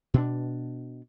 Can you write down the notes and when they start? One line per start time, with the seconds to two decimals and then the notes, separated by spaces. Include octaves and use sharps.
0.14 B2 D4